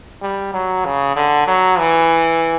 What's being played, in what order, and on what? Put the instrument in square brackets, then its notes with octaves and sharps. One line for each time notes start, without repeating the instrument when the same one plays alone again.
[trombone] G3
F#3
C#3
D3
F#3
E3